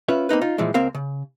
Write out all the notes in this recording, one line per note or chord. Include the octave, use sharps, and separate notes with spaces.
C#4 F4 B4 E5
A#3 C4 D#4 B4
D#4 F4
A#2 E3 F3 G3 G#3
C#2 A#3 C4 A#4 F5
C#3